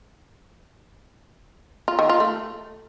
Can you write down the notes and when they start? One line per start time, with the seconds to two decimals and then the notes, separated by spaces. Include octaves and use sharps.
1.88 F4
1.99 D#3
2.09 F4
2.20 A3